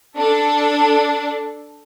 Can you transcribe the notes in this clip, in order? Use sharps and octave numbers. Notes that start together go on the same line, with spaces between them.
D4 A4